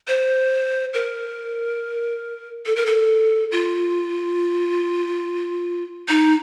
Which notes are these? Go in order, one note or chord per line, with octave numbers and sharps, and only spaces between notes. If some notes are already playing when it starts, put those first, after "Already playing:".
C5
A#4
A4
A#4
A4
F4
D#4